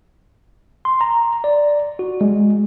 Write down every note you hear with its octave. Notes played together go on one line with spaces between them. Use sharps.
C6
A#5
D5
F#4
G#3